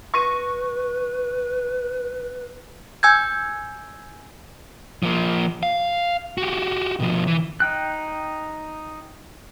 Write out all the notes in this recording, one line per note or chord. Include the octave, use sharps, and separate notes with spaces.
B4 C#6 A#6 D#7
G#5 E6 G6 G#6
F3 A#3
F5
F#4 G4
B2 F3
E3
D#4 G5 F#6